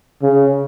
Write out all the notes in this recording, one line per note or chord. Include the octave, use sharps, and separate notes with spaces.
C#3